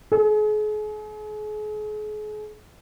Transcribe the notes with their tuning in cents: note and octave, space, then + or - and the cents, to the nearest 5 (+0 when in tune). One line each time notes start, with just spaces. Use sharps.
G#4 +40